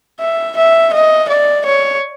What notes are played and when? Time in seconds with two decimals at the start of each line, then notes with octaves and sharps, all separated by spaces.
0.20 E5
0.57 E5
0.93 D#5
1.29 D5
1.65 C#5